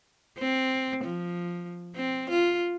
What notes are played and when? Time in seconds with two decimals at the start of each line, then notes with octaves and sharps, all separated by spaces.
0.39 C4
1.04 F3
1.96 C4
2.30 F4